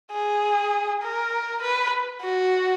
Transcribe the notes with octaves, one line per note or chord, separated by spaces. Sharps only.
G#4
A#4
B4
F#4